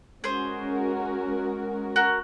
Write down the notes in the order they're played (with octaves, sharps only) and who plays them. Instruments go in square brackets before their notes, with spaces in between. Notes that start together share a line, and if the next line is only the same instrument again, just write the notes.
[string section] G#3 C#4 F#4 A#4 [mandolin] G#4 C5
[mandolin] F#4 A#4